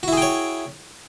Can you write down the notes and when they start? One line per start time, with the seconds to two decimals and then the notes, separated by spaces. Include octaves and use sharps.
0.03 F#4
0.08 E4
0.13 G#4
0.17 G5
0.22 C#5